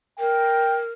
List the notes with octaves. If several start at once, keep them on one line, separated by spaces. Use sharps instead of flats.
A#4 G5